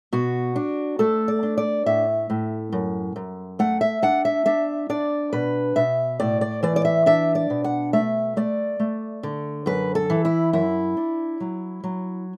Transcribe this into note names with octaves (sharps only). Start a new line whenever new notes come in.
B2 F#4
D4
A3 A4
D5
D4
D5
A2 E5
A2
F#2
F#2
A3 F#5
E5
D4 F#5
E5
D4 E5
D4 D5
B2 B4
B2 E5
A2 D5
D5
E3 D5
D5
E5
D4 E5
D5
B2
F#5
A3 E5
A3 D5
A3
D3
F#2 B4
A4
E3
E4
F#2 E4
D4
F#3
F#3